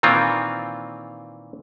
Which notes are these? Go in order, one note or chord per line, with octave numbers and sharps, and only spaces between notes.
A#2 D#3 E3 C4 F4